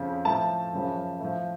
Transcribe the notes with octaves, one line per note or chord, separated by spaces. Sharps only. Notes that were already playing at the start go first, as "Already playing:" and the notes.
Already playing: F2 C#3 F3
A2 F3 A5
F#2 C#3 F3
A2 F3